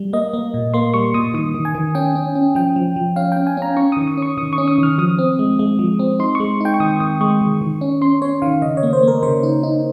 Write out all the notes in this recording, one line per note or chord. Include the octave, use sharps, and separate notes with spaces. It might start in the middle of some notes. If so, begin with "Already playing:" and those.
Already playing: G3
A#3 D#5
A#3
A#2
A#3 C6
G3 C#6
A#2 D#6
D#3 D#6
D#3
G#5
D#3
C#4 G5
C#4
C#4
F3 G5
F3
F3
C#4 F5
C#4 G5
G#5
C#4 A#5
C#4 C#6
D#3 D#6
D#6
C#4 C#6
D#3 D#6
C#6
C#4
D#6
D#3 F6
F3 D#6
C4
G#3
G#3
F3
C4
D#4 C6
G#3 C#6
D#4 G5
C#6
D#3 D#6
D#3 D#6
G#3 C#6
D#3
D#3
C#4
C#4 C6
C#4 C#5
D#3 F5
C#3 D#5
C#5
A#3
C5
A#3 A#4
C#3 C5
D#4
D#4